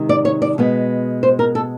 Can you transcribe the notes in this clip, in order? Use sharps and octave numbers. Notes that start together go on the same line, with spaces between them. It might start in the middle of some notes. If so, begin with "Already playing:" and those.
Already playing: C3 D#3 G#3
D5
C#5
D5
B2 G#3 B3
C5
A#4
A4